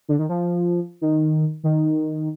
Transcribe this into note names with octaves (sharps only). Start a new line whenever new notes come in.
D3
D#3
F3
D#3
D#3